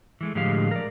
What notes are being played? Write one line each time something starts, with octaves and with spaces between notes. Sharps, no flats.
E3 G#3 A3
A2 D3 F3 G#3 G4 F5
A#4 D5